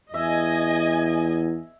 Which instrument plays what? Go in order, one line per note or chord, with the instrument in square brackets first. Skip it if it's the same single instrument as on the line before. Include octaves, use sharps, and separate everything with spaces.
[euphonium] E2 [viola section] D#5 G#5 [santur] E5